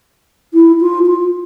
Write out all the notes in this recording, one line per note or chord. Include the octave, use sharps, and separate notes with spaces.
E4
F4
F4